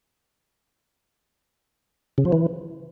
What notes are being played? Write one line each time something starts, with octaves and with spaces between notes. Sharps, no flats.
C#3
F3
E3